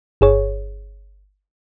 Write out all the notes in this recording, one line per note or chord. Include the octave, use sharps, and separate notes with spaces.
G1 G#4 C#5